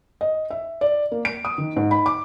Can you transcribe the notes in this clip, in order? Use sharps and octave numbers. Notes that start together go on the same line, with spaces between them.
D#5
E5
D5
A#3
D7
D#6
D#3
G#2
B5
D6